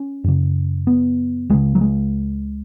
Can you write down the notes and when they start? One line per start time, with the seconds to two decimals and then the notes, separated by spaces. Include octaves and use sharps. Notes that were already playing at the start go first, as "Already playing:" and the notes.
Already playing: C#4
0.24 F#2 C#3
0.87 B3
1.50 C#2 C#3 G#3
1.75 F#3
1.81 G#3